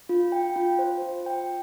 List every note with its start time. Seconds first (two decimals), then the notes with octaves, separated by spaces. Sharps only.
0.09 F4
0.32 G5
0.56 F4
0.79 C5
1.02 F4
1.26 G5